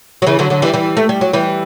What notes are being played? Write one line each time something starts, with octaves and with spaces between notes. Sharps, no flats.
F#3
C#3 E3
D3 F#3
D3 F#3
E3 G3
E3 G3
A3
G3
F#3
E3 G3